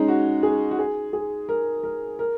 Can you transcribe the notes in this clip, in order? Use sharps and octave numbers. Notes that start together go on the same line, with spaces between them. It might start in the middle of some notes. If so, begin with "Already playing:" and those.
Already playing: G#3 C#4 D#4
F#4
G#4
F#4
G#4
G#4
A#4
A#4
A#4